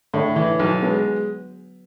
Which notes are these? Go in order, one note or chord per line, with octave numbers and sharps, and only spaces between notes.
A2 D3
D3 E3
B1 F#3
G#3 B3